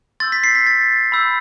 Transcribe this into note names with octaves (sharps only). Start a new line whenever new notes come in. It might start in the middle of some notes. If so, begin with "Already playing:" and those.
C6 E6 G6 A6
B6
C7
B6
A6
B5 E6 G6